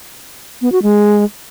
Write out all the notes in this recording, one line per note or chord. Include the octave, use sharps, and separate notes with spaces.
B3
F#4
G#3